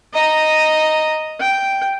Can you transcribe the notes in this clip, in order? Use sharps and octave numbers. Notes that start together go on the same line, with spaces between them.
D#5 A#5
G5